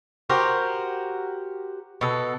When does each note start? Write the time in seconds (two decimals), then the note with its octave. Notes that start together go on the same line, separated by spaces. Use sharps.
0.29 F#4 G4 A#4 C5
2.01 B2 A4